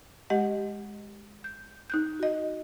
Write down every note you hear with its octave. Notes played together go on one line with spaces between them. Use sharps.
G#3 G4 D#5 F#5
G6
D#4 F#6 G6
F#4 D#5